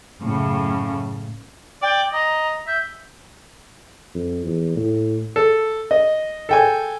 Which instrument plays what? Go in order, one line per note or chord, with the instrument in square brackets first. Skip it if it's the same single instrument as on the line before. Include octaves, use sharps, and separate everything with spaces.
[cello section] F#2 A2 C#3
[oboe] D5 [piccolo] G5
[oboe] D#5 [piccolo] A#5
[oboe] E5 [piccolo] G6
[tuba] F2
E2
A2
[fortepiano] A4
D#5
A4 G5 G#5